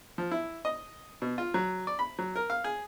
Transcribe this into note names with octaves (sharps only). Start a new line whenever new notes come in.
F3
E4
D#5
B2
F4
F#3
D5
B5
F#3
A#4
F5
G#4